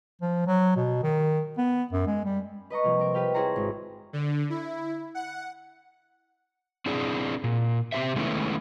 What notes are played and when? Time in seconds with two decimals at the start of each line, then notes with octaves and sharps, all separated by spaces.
0.22 F3
0.47 F#3
0.76 B2
1.03 D#3
1.58 B3
1.92 F#2
2.07 G#3
2.25 G3
2.70 B4 D#5 A#5 C#6
2.84 C3 F3 G3 A#3
3.00 C4 A#4 D7
3.14 G4 B4 F5 G5
3.34 E4 G#4 A4 C5 C#5 A#5
3.56 G#1
4.13 D3
4.50 E4
5.15 F#5
6.86 C4 D4 E4 G#4
7.44 A#2
7.92 C3 C4 G4 C5 E5
8.16 D#3 G#3 A3 B3 C#4 E4